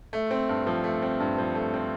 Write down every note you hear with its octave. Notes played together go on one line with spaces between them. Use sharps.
A3
C4
G2
F3
A3
C4
G2
F3
A3
C4